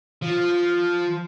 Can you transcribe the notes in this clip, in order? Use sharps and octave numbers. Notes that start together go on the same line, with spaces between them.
F3